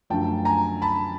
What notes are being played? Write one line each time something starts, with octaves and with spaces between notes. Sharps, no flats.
F#2 D3 F3 A3 G5 A5
G#5 A#5
A5 B5